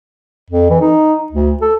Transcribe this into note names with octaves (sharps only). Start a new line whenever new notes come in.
F2
E3
D#4
D2
A4